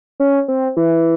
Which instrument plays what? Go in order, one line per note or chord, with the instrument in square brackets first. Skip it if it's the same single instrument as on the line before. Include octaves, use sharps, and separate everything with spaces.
[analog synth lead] C#4
C4
E3